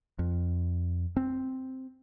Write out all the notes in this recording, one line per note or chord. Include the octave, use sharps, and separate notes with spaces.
F2
C4